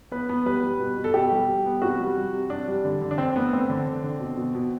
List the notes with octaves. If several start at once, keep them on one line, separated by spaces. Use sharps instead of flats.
B3 B4
B3
G3 B4
G3
B2
B2
A4
B2 G4
G3
G3
B3
C3 F#4
G3
G3
C3
C3 D4
G3
D3
D3
D4
D3 C4
A3 B3
A3 C4
D3
D3
D3
B2
B2
B2